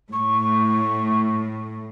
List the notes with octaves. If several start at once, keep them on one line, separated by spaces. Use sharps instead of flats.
A2 C#6